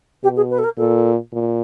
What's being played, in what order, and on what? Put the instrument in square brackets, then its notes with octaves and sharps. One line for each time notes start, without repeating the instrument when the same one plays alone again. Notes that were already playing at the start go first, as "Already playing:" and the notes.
[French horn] B2 [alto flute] G4
[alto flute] G#4
B4
A4
A#4
[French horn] A#2 [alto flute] A4
[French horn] A#2